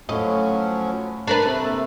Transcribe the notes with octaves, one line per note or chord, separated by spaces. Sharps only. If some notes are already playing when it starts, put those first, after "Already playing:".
A2 F3 F#3 A3 C#4 D#5
D4 A#4 B4
C3 A3 B4
A#3 E6